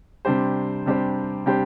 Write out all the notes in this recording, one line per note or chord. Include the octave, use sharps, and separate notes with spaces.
C3 G3 D4 G4 C5
C3 G3 D4 G4 C5
C3 G3 D4 G4 C5